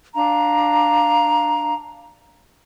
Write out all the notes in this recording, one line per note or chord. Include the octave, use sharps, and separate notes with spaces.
D4 F5 A#5